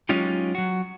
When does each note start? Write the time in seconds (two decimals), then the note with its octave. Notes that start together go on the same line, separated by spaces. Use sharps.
0.09 F#3 G#3 C#4 D#4 F4 G4
0.55 F#3 F#4